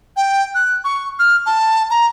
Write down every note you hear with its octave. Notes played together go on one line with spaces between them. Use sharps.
G5
F#6
C#6
F6
A5
A#5